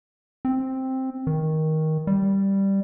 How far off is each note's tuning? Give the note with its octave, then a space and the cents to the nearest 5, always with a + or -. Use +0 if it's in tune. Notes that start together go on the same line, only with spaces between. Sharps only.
C4 +5
D#3 +15
G3 +0